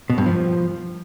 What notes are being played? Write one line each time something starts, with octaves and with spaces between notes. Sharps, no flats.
B2
G2
F3